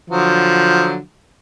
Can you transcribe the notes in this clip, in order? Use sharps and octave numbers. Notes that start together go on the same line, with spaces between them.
D3 F3 F#3